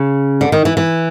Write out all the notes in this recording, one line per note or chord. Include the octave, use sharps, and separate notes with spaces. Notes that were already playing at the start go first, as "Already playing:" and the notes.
Already playing: C#3
D3
D#3
E3
E3